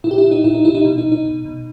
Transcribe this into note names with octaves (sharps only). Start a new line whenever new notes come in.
A#2 E4
G4
E4
A#2
D#4
A#2 E4
D#4
A#2 E4
D#4
B2 E4
D#4
B2
D#4
B2
B2